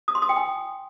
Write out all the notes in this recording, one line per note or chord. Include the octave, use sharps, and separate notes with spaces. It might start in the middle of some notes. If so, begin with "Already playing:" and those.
D#6
C6
D#6
G5
G#5